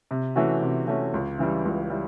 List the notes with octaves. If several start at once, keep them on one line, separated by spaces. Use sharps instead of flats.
C3
E3 A3 C#4 F#4
C3
E3 A3 C#4 F#4
C#2
C#3 E3 G3
C#2
E3 G3